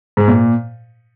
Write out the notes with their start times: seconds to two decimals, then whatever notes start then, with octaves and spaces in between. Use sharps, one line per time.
0.17 G#2
0.28 A#2